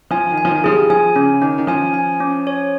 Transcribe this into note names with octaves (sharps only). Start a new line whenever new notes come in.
F3 G#5
D#3
G#5
F3
D#3
F3 G#4
G3
F3 G#5
C#3 C#4
D#3 C#4
D#3
F3 G#5
G#5
C#4
C#5